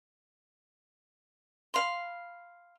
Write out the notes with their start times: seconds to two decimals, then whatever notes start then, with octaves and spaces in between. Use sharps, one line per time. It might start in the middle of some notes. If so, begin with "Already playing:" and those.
1.74 F5 B5 C6